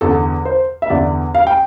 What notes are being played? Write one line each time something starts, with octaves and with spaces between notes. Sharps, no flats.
E2 D3 A4
C5
E5
E2 D3 D5
F5
G5